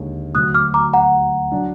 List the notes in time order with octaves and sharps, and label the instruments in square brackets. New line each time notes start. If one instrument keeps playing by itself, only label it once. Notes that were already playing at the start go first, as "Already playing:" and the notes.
Already playing: [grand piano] D#2 D3 G#3
[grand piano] D2 D3 F#3 [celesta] D#6 F#6
[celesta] D6 F6
A#5 D6
F#5 A#5
[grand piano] F#3 D4